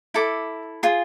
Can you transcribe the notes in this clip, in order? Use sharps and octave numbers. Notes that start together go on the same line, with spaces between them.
E4 A4 D6
F4 G#4